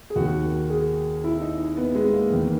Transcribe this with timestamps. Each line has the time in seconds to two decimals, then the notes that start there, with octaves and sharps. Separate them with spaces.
0.10 G#4
0.16 D#2 D#3 F#4
0.70 G#4
1.24 E4
1.41 D#4
1.77 B3
1.95 G#3
2.13 A#3
2.31 E2 D#3